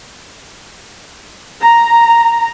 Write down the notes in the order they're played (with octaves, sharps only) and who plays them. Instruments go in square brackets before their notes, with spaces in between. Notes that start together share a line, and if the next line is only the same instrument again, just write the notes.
[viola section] A#5